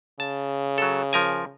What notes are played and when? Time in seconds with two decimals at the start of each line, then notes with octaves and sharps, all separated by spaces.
0.20 C#3 A5
0.78 F#3 A4
1.13 F3 A#4 G#5